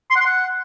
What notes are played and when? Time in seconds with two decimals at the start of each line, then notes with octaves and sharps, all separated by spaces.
0.11 C6
0.16 F#5
0.21 C6
0.26 F#5